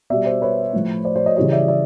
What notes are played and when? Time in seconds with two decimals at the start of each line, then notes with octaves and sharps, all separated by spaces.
0.10 B2 G3 D5 E5
0.26 C5 D5
0.42 B4 C#5
0.73 A2 F3
1.05 C5 D5
1.16 C5 D5
1.26 C#5 D#5
1.36 C#3 E3 G3 C#5 D#5
1.52 D5 E5
1.68 D5 E5